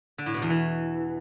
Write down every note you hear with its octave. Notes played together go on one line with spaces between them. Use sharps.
D3
A2
B2
E2
E3